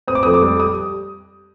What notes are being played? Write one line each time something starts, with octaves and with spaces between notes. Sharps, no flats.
C4 D#6
D6
F2 D#6
D6
G3
D#6